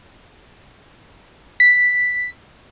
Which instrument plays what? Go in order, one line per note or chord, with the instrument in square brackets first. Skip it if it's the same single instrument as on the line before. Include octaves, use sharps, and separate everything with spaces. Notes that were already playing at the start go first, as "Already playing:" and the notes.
[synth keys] B6